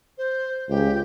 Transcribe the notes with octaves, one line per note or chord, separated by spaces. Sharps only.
C5
C#2 G4